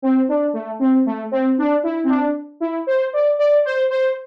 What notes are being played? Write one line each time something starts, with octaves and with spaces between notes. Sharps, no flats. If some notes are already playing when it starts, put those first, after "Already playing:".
C4
D4
A3
C4
A3
C4
D4
E4
C4
D4
E4
C5
D5
D5
C5
C5